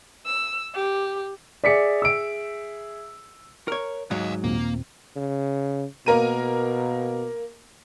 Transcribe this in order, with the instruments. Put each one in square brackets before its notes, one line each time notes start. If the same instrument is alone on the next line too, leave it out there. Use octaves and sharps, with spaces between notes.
[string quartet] E6
G4
[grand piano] G#4 E5 [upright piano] D5 B6 C#7
[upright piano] E6 D7
[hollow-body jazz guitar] A#4 C#5
[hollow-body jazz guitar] G#2 F#3 [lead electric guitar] D#5 F5
[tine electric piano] D#2 A#2 C4 [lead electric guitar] A#3
[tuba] C#3
[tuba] B2 [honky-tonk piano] A#3 A#4 D#7